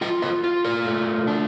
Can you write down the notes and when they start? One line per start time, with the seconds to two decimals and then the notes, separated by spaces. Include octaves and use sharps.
0.01 F4 D#5 G5
0.22 C5 D#5
0.44 F4
0.64 A#4 D5
0.85 A3
1.27 D4